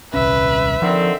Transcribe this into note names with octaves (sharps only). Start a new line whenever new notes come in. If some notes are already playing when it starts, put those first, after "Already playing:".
D#1 C2 C#4 B4 E5
D3 D#3 F3 C4